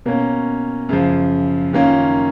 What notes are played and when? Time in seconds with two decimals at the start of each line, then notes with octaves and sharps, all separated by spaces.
0.06 B2 A#3 C#4
0.89 F#2 C#3 F3
1.73 F#2 D#3 A#3 C#4 F4